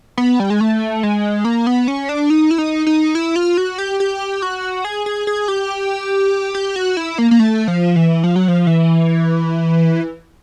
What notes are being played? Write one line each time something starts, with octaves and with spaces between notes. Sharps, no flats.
B3
G3
G#3
A3
G#3
A#3
B3
C#4
D4
D#4
E4
D#4
D#4
E4
F4
F#4
G4
G4
F#4
G#4
G#4
G#4
G4
G4
F#4
E4
A#3
A#3
A3
F3
E3
F3
F#3
F3
E3